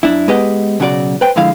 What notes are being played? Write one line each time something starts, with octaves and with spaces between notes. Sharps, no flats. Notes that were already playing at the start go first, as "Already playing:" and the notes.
F#2 D4 E4
G#3 B3 G4 B4 D#5 F#5
B1 C#3 F#3 F#4 A#4 D5
B4 C5 G5
D3 F3 G#3 E4 F5